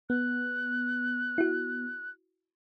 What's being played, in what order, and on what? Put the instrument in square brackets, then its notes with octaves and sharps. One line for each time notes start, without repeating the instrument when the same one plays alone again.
[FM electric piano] B3 [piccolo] F#6
[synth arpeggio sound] E4 F#4